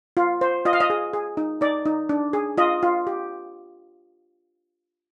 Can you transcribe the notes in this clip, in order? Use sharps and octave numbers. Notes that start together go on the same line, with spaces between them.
F4
C5
F4 D#5
F5
D#5
G#4
G#4
D#4
D#4 D5
D#4
D4
G#4
F4 D#5
F4
G4